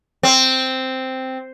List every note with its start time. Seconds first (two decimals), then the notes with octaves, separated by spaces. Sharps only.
0.23 C4